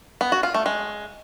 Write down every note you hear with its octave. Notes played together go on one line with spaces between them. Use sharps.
B3
F#4
F4
A3
G#3